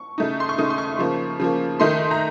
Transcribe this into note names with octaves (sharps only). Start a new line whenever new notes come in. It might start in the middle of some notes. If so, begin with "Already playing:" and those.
Already playing: C#6
C#3 A3 D#4
C6
C#6
C#3 A3 D#4 D#6
C6
C#6
C#3 F3 A#3
C#3 F3 A#3
D#3 A3 D#4 C6
A#5